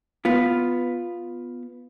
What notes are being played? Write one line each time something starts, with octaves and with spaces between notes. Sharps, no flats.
B3 F4